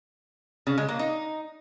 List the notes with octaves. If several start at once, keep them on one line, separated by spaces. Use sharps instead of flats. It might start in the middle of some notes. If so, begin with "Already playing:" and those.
C#3
G#3
A#3
D#4